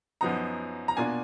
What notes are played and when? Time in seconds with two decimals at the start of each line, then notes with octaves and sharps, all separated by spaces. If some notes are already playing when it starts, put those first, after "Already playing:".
0.21 F#2 F3 B3 D#4 A#5
0.88 A#5
0.97 B2 A#3 D4 F4 G#5